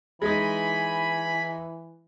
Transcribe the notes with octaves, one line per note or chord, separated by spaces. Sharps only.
E3 G#3 D#4 G#5 B5